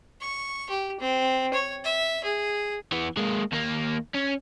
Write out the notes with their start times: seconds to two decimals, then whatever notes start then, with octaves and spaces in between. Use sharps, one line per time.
0.21 C#6
0.70 G4
1.00 C4
1.54 C#5
1.84 E5
2.24 G#4
2.92 E3 B3
3.17 G#3 A#3
3.52 D#2 A#3
4.14 C#4